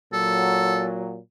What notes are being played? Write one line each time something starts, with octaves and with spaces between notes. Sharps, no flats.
A#2 F#3 A4